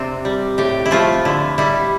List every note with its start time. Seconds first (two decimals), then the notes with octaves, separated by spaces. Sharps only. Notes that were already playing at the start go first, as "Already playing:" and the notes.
Already playing: C3 C4 D4
0.25 G3
0.58 A2 G4
0.86 E4
0.91 F3 A3 F4
1.25 D3 E4
1.58 G3 E4